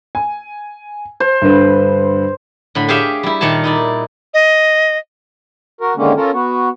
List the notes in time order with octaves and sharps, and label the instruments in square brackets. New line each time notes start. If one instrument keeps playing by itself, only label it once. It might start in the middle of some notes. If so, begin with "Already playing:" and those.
[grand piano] G#5
[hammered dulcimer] C5
[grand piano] G2 D3 B4
[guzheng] A2 D3 B5
G4 G#4 C#5 E5 F5 G5
G3 E4
A#2 D#3 C#5 D5 A5
D#4 E4 D5
[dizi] D#5
[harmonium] F#4 A#4
D3 D#3 G#3 A#3 C#4
C#4 F4 A4 A#4
B3 F#4